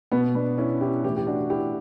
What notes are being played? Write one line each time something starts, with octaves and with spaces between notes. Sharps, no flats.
B2 B3
B3 D4
C#4 E4
E4 G4
A2 E3 E4 G4
G4
D4 F#4
E4 G4